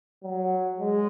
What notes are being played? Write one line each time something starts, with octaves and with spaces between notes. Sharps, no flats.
F#3
G#3